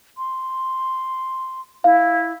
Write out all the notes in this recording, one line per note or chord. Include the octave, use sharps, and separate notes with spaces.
C6
E4 F5